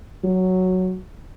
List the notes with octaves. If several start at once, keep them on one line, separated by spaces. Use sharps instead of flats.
F#3